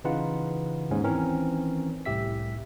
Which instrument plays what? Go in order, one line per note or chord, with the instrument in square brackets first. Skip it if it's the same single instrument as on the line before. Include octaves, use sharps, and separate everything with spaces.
[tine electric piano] C#3 E3 D#4 F4 B4 F#5
D#2 G#2 C#4
D#3 E3 C4 C#4 A#4
C2 A2 G4 E5 B6